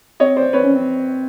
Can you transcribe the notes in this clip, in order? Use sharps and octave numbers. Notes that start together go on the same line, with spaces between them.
C4 C#5 D#5
C5 D5
C4 B4 C#5
C#4
C4